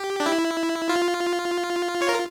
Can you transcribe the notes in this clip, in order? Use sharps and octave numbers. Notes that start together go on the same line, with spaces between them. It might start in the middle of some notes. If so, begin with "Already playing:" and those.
Already playing: G4
D4
E4
F4
C#5
A#4